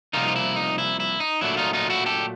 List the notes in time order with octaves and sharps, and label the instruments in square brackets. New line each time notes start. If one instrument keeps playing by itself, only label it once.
[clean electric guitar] C2 C3 F3 A#3 D#4 F4
F4
E4
D#4
E4
E4
D#4
A#2 F#3 A3 D4 E4
D#4 F4
D#4 F4
E4 F#4
G4 A4